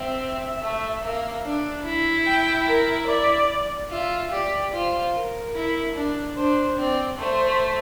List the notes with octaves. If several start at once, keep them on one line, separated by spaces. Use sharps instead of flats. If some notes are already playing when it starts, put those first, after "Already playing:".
Already playing: C4 E5
A3
A#3
D4
E4
G5
A#4
D5
F4 E5
G4 D5
F4 C5
A#4
E4
D4
D4 C5
C4 D5
A3 C5